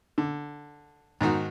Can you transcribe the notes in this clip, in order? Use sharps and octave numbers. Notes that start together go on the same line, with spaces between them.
D3
G#2 D#3 D#4 F#4